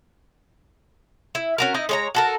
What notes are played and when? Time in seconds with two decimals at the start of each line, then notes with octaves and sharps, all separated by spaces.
1.35 E4
1.58 C#4 F#4 A#4
1.74 D#4 E4 D#5
1.89 G#3 C#5 A#5
2.15 F#4 A4 A#4